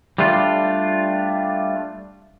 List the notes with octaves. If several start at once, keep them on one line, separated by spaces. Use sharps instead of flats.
G3 A3 D4 F4